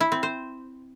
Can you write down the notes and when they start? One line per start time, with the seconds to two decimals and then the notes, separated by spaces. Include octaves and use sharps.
0.01 E4
0.12 C4
0.23 C5